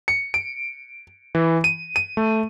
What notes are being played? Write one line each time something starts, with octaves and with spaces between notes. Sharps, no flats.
C#7
D7
E3
D#7
D#7
A3